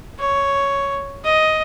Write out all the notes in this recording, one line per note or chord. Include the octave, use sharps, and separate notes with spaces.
C#5
D#5